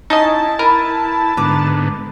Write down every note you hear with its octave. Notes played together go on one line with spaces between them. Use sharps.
C#4 D#4 E4 D#5 G#5 A5
E4 A#4 B4
G#2 D3 B3 B4 A#5 D6